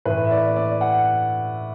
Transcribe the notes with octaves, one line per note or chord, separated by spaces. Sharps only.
A2 E3 B4
E5
D5
D5
F#5